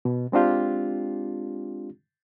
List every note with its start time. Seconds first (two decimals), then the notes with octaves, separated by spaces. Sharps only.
0.05 B2
0.32 G#3 C4 D4 F4 G4